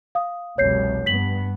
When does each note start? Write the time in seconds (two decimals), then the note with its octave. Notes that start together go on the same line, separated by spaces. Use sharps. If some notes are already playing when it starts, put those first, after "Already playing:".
0.15 F5 D#6
0.58 F1 C2 B2 C#5 G6 C7
1.06 G2 B3 B6 F#7